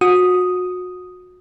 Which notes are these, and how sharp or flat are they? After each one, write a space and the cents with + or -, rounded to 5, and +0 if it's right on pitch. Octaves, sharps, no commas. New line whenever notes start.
F#4 -30 D#6 +0